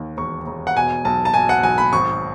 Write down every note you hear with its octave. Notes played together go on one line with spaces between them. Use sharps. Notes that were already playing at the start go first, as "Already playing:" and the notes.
Already playing: D#2 D#3
E1 C#6
E1
F#5
B2 G#5
B1 A5
A5
B2 G#5
F#5
B1 G#5
B5
G#1 C#6